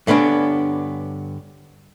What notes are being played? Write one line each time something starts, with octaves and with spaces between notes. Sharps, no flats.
G2 D3 B3 C#4 D4